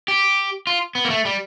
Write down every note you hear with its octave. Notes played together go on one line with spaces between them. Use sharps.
G4
F4
B3
A#3
A3
G3